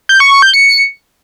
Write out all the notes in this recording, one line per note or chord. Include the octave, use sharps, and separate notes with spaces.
G6
C#6
C#6
G6
C#7